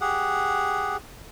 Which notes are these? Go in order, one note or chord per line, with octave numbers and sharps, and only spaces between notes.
G4 G#4 F#5